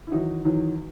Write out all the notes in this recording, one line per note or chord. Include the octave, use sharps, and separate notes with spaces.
E4
E2 D#3 F#3 D#4 F#4
E2 D#3 F#3